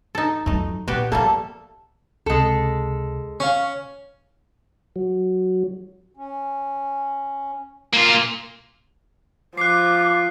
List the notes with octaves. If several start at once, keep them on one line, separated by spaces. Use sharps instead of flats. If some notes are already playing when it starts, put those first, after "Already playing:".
D#4 A4
F2 F#3 A3 D#4
A#2 B3 F#4 G4 B4
F3 G3 A3 A#3 A4
C#2 C3 G#3 A4
C#4 F5 C#6
F#3
C#4
A#3 F4
F3 D6 F#6 C7